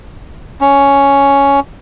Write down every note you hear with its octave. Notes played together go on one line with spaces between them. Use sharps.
C#4